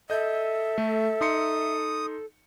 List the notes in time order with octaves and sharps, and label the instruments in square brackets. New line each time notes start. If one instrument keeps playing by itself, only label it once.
[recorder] A4 [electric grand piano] D#5 G6 [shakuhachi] E5
[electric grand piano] A3
[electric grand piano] D#4 C6 C#7 [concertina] D#6